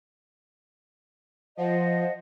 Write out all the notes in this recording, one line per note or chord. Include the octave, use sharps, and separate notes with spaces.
F3 C5 D#5 F#5